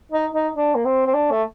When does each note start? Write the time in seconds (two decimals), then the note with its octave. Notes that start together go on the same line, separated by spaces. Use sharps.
0.12 D#4
0.34 D#4
0.55 D4
0.75 A#3
0.85 C4
1.06 C4
1.14 D4
1.31 A3